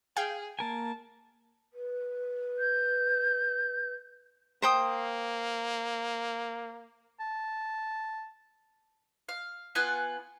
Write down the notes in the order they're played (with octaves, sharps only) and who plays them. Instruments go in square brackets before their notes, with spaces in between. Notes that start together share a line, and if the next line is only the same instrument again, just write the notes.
[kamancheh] G#4 [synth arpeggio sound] F5 G5 G#6
[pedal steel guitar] A#3 A#4 G#5 [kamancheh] A5
[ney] B4
[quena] G6
[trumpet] A#3 [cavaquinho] C5 G5 D#6
[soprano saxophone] A5
[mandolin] F5
B3 F4 F#5 G#5